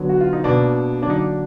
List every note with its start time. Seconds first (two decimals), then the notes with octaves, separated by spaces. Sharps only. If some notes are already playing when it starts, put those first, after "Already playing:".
Already playing: D3 F#3 B3
0.09 F#4
0.21 F4
0.33 D#4
0.44 B2 A#3 D4
1.02 D3 F#3 A#3 D4
1.10 D#4
1.17 D4